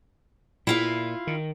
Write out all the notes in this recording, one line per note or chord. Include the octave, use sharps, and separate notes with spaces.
A#2 E4 F4 F5
D#3